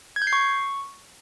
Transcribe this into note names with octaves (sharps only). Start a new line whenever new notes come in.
G#6
G6
C7
C#6